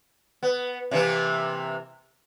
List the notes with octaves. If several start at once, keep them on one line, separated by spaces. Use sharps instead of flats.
B3
C3 E3 A#3